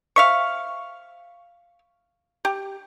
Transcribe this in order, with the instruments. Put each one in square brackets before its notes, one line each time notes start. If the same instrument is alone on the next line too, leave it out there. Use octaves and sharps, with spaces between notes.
[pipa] C5 E5 F5 [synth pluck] C#6
[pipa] G4